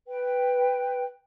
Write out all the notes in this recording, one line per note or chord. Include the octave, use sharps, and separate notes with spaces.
B4 G5